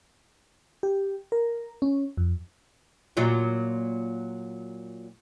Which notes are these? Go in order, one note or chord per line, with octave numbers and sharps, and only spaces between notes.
G4
A#4
C#4
F2
A#2 F#3 F4